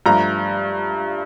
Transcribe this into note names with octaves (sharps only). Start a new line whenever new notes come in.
G2 F3 A3 A#5